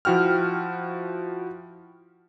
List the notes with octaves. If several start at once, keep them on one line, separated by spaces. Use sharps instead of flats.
F3 E4 F#4 G5 F6